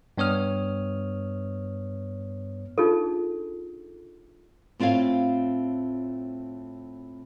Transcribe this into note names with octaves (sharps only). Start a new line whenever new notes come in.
G2 B3 C#5 D#6 F6
D4 D#4 F4 G#4 A4
A2 C4 F4 C#5 F5